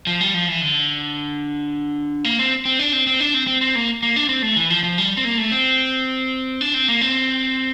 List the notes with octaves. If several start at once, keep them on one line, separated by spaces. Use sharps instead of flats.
F3
G3
F3
E3
D3
A#3
C4
C4
D4
C4
C4
D4
C4
C4
C4
A#3
A#3
D4
C4
A3
E3
F3
F3
G3
C4
A#3
A3
C4
D4
C4
A#3
C4